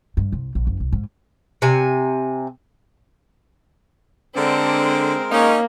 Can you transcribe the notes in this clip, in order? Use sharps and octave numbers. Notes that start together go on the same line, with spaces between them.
G2
C2
A#1
F#1
C2
G#2
C3 G#5
D3 G#3 C4 A#4
A#3 C#4 D#4